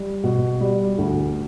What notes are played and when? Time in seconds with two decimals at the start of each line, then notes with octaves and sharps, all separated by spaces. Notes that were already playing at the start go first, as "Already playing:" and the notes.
Already playing: G3
0.24 B2
0.61 G3
0.98 D2